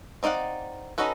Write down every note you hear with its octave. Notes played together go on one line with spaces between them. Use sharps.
C4 D#4 D5 F5 F#5
C#4 D#4 F#4 A4 B4